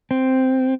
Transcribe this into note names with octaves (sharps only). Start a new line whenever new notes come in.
C4